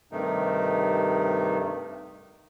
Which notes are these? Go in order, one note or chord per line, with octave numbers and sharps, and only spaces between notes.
G2 C3 D#3 A3 D#4